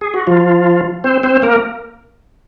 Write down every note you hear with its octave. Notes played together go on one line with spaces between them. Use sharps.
G#4
F#4
F3 F4
C4 C5
C4 C5
A#3 A#4